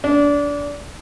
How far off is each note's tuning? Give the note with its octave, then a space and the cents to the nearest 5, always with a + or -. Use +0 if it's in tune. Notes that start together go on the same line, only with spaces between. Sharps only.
D4 -25